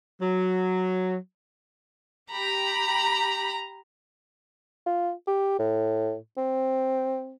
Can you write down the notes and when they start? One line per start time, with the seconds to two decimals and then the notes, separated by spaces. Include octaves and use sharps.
0.21 F#3
2.32 G4 A#5 B5
4.86 F4
5.27 G4
5.59 A2
6.37 C4